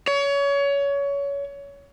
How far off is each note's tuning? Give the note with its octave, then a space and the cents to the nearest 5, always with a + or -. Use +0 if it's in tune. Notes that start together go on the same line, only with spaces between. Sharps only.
C#5 +25